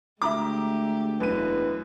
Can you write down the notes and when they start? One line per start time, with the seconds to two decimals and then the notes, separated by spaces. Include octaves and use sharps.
0.22 D2 G#3 A3 G4 E5 A#5 D6
1.20 E1 F#2 B4 D#7